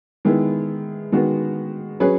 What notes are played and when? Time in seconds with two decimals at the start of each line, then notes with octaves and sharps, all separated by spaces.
0.25 D#3 G#3 B3 E4
1.12 D#3 G#3 B3 F#4
2.00 F#3 C#4 G#4 B4